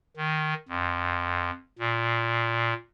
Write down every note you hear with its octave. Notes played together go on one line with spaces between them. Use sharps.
D#3
F2
A#2